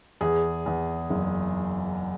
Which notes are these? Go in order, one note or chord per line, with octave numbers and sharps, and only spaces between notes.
E2 G#4
E2
F#1